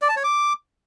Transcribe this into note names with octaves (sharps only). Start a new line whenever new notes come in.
D5
A5
C#5
D6